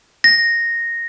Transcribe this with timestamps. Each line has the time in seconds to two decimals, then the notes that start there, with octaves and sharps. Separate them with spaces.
0.24 A#6